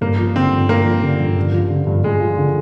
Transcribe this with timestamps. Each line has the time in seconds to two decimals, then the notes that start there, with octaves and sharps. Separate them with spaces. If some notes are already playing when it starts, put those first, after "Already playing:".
0.01 G2 A#3
0.19 F3
0.36 D3 C4
0.52 G2
0.69 G2 A#3
0.86 F3
1.02 D3
1.20 G2
1.37 G2
1.53 F3
1.70 D3
1.87 G2
2.04 G2 G#3
2.20 F3
2.38 D3